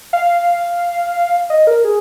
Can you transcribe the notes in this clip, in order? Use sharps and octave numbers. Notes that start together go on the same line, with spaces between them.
F5
D#5
A#4
G#4